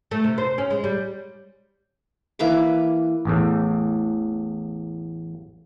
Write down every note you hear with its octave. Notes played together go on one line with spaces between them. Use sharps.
A3
C3
C5
C#4
G#3
G3
E3 A#3 B4 D6
A1 E2 A2